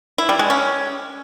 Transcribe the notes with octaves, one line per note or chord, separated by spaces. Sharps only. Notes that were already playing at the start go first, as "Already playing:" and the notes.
E4
G3
G#3
C#4